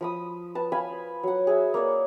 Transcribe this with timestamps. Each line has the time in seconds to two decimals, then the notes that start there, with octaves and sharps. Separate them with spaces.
0.01 F3 B5 D#6
0.55 B4 A5
0.72 F5 G#5 B5
1.23 F#3 F#5
1.47 G#4 E5
1.74 A#3 C#5 D5